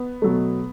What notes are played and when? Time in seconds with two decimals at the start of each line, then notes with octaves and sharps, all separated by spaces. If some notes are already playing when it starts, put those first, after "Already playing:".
Already playing: B3
0.22 B2 F#3 A3